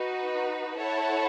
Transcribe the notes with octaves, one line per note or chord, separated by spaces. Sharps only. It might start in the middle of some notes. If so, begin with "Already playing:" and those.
Already playing: D#4 F#4 B4
E4 A4 C#5 F#5 A5